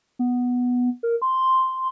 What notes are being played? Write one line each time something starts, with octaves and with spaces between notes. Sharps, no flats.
B3
A#4
C6